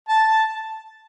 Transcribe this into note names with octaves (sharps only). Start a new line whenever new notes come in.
A5
A5